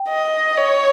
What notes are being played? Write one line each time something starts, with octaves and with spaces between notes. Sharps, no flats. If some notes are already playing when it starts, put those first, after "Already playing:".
Already playing: G5
D#5
C#5